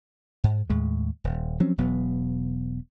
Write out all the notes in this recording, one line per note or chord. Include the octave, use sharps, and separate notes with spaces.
G#2
D#2 A2 G#3
D#1
F3 F#3 C4 C#4
E1 B2 F#3 B3